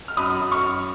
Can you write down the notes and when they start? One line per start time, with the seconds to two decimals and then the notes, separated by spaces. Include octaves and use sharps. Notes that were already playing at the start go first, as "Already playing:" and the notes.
0.08 F6
0.17 F#2 B5 D#6
0.40 F#2
0.52 C#6 F6
0.63 F#2